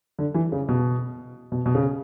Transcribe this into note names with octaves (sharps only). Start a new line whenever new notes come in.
D3
E3
C#3
B2
B2
B2
C#3